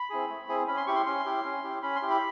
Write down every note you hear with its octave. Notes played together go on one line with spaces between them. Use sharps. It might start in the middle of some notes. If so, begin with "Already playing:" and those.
Already playing: B5
C4 E4 G#4
A3
C4 E4 G#4
C#4 B5
C6
E4 G4 C#6
C6
C#4 C6
E4 G4
C#4
E4 G4
C#4 B5
C6
E4 G4
B5